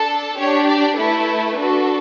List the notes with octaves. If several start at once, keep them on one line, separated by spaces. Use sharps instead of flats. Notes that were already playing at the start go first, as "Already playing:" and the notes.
Already playing: D4 A4
D4 G4 C#5
D5
A3 E4 A4 B4
D4 F#4 A4